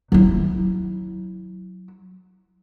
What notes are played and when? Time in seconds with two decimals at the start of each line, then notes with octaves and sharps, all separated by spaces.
0.12 F#3 E4